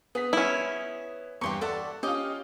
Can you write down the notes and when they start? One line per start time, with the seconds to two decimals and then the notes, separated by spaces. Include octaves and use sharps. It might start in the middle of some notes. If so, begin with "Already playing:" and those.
0.15 B3 G#4 B6
0.33 C#4 E4
1.41 E2 G2 G4 C6 C#6
1.61 A4 D5 E5 F#5
2.03 C#4 F4 G4 D#5